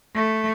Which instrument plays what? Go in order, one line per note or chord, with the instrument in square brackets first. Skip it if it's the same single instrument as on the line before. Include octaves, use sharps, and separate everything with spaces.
[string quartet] A3